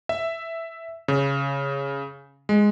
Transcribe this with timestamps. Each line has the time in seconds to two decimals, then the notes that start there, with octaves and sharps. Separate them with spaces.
0.09 E5
1.08 C#3
2.49 G#3